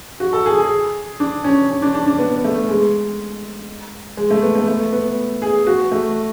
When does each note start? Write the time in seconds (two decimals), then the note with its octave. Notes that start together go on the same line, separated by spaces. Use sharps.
0.20 F#4
0.33 A4
0.46 G#4
0.58 G#4
1.20 D4
1.44 C#4
1.69 C#4
1.82 D4
1.94 D4
2.06 D4
2.19 B3
2.44 A3
2.69 G#3
4.17 G#3
4.31 A3
4.43 B3
4.55 A3
4.67 A3
4.92 B3
5.42 G#4
5.67 F#4
5.91 A3